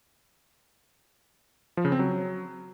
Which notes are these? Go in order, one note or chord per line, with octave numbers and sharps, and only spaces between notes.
F3
C#3
C4
F#3